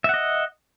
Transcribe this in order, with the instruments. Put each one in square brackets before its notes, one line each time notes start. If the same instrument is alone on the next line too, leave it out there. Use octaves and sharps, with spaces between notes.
[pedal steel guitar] E5
F#5
D#5